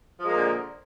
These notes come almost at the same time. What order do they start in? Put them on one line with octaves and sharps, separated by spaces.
F3 G#3 A#3 A#2 D3